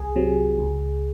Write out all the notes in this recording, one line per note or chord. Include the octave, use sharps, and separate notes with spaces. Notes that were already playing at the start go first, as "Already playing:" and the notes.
Already playing: C2 G#4
C3 F#3
C#2